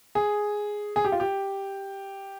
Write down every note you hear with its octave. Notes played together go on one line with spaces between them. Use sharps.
G#4
G#4
G4
F4
G4